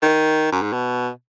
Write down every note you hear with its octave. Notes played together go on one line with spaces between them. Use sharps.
D#3
F#2
G#2
B2